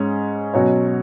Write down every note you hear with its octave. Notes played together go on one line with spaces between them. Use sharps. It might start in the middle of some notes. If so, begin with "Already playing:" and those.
Already playing: G#2 G#3 C#4
B2 F#3 C#4 F#4 C#5